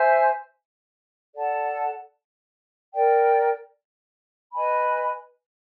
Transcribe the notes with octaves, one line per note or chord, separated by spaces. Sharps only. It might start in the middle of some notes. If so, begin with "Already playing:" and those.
Already playing: C5 E5 G#5
A4 D5 F#5 A5
A#4 D5 G5
B4 D#5 G#5 B5